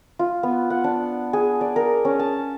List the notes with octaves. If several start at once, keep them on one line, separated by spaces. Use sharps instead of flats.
F4
B3
F#5
D4
G#4
D5
A#4
C#4
A5